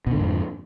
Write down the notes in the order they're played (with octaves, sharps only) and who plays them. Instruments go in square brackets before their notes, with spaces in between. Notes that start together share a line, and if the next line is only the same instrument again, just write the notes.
[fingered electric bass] B2
D3
G#2
F2